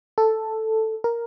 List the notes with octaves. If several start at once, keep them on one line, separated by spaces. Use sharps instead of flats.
A4
A#4